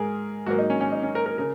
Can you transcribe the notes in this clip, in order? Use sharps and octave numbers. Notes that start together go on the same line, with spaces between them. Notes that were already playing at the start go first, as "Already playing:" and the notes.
Already playing: G#2 G#3 G#4 A#4
G#2 F#3 A#3 F#4
D#4
C#4
C#4
D#4
C#4
A#4
A#4
C#3 A#4